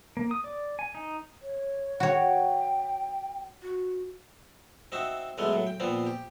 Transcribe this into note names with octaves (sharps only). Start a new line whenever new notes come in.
A#3
D#6
D5
G#5
D#4
C#5
F#4 C#5 G5
F#4
C4 D#4 F#4 E5
E2 E3 F#3 G#3 A3
A2 F#3
G5
A#2 F3 B3 C4
G4